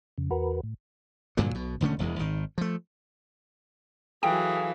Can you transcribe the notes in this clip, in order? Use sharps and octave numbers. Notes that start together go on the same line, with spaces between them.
F2 C#3
E2 F#4 A#4 B4
A2
G2 A#2 D3 F#3
B1 B2
E1 D3 A3 C#4
E1 E2 G#3
G#1 D#3
F3 A3
E3 F#3 G#4 A4 F5 G5 G#5